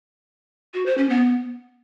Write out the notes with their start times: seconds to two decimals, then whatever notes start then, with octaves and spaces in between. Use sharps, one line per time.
0.74 F#4
0.86 C5
0.98 C#4
1.09 B3